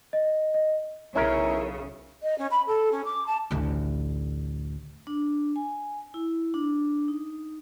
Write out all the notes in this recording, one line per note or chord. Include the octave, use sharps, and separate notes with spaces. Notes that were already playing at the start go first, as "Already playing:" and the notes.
D#5
D#5
B1 C#3 C#4 E4 A#4
D#5
C#4
B5
A4
C#4
D6
A5
A1 D2
D4
G#5
E4
D4
D#4